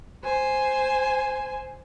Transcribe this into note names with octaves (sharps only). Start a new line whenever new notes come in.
C5 G#5